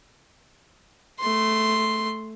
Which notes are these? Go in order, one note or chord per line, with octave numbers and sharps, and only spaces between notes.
A3 C6